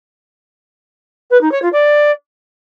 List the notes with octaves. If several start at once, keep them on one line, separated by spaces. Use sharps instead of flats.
B4
D#4
C#5
F4
D5